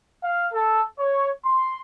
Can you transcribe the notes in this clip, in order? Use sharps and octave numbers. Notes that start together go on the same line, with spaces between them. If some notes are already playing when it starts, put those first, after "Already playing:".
F5
A4
C#5
C6